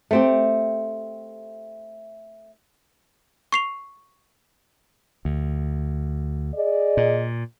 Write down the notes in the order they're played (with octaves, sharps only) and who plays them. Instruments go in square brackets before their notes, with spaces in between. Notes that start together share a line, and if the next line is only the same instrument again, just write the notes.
[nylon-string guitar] A3 C4 G4
[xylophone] C#6 C7 F7
[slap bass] D2
[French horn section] G#4 D5 D#5
[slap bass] A#2